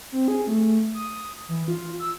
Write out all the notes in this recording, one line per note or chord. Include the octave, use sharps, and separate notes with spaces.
C4
G#4
A3
D#6
E3
F4
E6